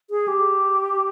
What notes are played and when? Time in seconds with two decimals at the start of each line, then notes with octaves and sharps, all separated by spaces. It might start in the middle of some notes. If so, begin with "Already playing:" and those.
0.10 G#4
0.28 G4